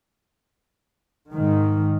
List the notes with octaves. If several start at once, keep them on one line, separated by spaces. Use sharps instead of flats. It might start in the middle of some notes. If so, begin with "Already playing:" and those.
G#2 D#3